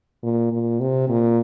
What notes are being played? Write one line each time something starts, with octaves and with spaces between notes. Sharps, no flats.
A#2
A#2
C3
A#2